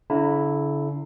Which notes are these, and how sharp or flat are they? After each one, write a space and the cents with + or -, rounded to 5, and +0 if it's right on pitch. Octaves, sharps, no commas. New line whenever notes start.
D3 -45 E4 +0 A#5 -25